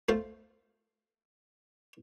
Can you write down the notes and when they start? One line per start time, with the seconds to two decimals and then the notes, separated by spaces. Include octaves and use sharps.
0.09 A3 F4 C5